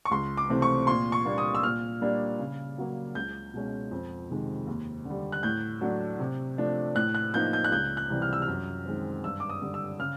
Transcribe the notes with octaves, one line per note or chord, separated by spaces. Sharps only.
C#6
C#2 C6
D6
C3 E3 A3 C4
C#6
A#2 C6
C#6
G3 A#3 D4
D#6
E6
A#2 F6
G3 A#3 D4
C#3
F#3 A#3
C#2 G6
B2 G#3 C#4
F2
C3 D#3 G#3
D#2
D3
G3
F#6
A2 G6
F#3 A3 D4
C3
F3 A3 D4
A2 F#6
F#6
F3 A#3 D#4 G6
G6
F#6
C#2 G6
F#6
C3 E3 G3
F6
E6
F6
F#2
D#3 G#3 C4
G2 E6
D6
D#6
D3 G3
E6
C#3 F6